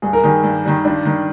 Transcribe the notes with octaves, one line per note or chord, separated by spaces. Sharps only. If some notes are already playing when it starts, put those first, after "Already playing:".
G2 G#4
A#4
D#3 G3 G#4
G2
D#3 G3
G2 D4
D#3 G3